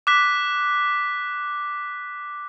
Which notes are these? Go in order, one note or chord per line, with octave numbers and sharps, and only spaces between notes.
D6 F#6 B6